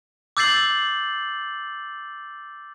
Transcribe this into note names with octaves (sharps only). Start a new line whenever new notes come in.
D6 E6 G6 A6 C7 F#7